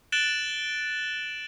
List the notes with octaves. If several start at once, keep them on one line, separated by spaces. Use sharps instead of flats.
F#6 A6 D7 E7 F#7 G7